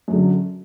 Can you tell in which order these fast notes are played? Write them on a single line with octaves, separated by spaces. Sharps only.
F#2 F#3 D3